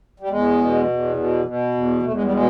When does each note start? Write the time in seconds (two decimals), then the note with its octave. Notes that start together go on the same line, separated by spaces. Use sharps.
0.20 G3
0.29 E2 G#3
0.59 B2
0.88 E2
1.16 B2
1.45 B2
1.75 E2
2.03 E2 A3
2.13 G#3
2.23 G3
2.32 B2 G#3